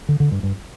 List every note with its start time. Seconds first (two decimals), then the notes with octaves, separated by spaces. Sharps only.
0.09 D3
0.20 D3
0.31 G2
0.43 G2